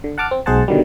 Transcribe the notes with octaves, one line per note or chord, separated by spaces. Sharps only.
D3
F#5 A5 D6 F6
C4
B1 G#3 G#4 C5 F#5 A5
B2 D3 D#3 F#3 G3